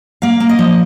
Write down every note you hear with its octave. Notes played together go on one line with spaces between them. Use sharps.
A#3 F5
A#3
D#5
F3